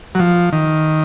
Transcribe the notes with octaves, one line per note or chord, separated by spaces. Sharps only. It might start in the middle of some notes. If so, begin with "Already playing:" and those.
F#3
F3
D#3